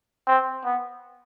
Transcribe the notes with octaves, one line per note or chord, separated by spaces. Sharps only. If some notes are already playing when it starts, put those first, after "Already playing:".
C4
B3